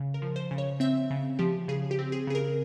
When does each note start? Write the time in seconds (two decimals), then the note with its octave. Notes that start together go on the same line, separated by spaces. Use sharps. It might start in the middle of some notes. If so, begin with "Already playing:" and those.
Already playing: C#3
0.14 A#4
0.22 F3
0.36 C5
0.51 C#3
0.58 C#5
0.80 C4 E5
1.10 C#3
1.39 F3 G4
1.68 C#3 G#4
1.91 G4
1.99 C4
2.12 G#4
2.27 C#3 G#4
2.35 A#4